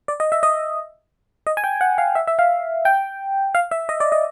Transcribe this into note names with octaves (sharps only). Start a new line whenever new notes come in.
D5
D#5
E5
D#5
D#5
G#5
G5
F#5
F5
E5
E5
F5
G5
F5
E5
D#5
D5
D#5